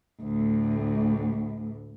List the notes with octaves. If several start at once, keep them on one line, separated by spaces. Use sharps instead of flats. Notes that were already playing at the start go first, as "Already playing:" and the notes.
D2 A2